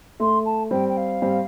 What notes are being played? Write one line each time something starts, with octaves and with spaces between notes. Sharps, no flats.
A3 C6
A5
G3 C4 G5
G5
F5
G3 C4